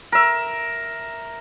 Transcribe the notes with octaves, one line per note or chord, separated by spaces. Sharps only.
A#4 E5